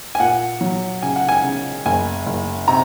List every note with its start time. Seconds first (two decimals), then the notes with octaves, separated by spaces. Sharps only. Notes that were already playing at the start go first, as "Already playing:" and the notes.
0.15 G#5
0.20 A#2 F#5
0.61 F#3
1.03 C#3 G#5
1.16 F#5
1.29 G#5
1.44 C#3
1.85 F#1 G#5
2.26 F#1
2.68 C3 A#5